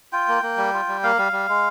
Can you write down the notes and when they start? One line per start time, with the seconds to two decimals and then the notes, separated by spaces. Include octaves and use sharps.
0.13 F4 G5
0.28 A#3
0.43 A#3
0.58 G3
0.73 F4
0.88 G3
1.03 A#3 F5
1.18 G3
1.32 G3
1.48 G#3